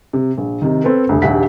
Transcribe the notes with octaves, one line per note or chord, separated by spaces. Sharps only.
C3
A#1
C3 D#3
C4 A4 B4
F1 D2
A#1 D#2 G4 E5 F#5 B6